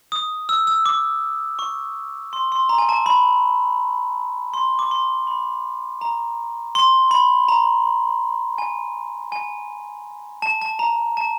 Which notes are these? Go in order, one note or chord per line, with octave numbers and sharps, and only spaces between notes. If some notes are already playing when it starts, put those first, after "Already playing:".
D#6
E6
E6
D6
C#6
C6
C6
A#5
G#5
A5
B5
C6
D6
C6
B5
A#5
C6
B5
A#5
G#5
G#5
A5
A5
A#5
A5